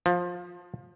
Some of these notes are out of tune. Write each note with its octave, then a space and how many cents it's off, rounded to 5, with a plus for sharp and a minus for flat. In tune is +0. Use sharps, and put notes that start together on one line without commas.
F3 +20